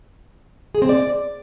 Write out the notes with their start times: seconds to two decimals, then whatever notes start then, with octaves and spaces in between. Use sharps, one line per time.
0.75 G#4
0.82 C4
0.89 D5